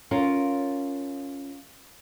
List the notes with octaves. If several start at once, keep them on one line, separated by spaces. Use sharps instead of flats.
C#4 F4 A#4